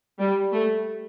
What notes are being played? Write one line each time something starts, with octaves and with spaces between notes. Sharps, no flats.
G3
A3